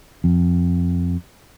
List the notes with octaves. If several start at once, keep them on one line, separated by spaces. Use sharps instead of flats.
F2